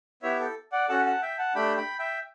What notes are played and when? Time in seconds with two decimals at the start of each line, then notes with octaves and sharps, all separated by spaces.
0.22 B3 E4 G4 C#5 E5
0.40 A4
0.72 D5 F#5
0.89 C#4 F#4 A4 F#5 A5
1.06 F#5 A5
1.22 E5 G5
1.38 F#5 A5
1.55 A3 D4 G4 G5 B5
1.77 G5 B5
1.99 E5 G5